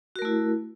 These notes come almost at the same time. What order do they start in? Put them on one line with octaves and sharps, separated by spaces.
F#4 A#4 A3 E4